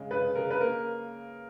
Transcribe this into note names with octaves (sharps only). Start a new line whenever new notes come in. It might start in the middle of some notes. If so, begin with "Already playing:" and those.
Already playing: C#3 G#3
C#3 B4
C#3 A#4
B4
A#3 A#4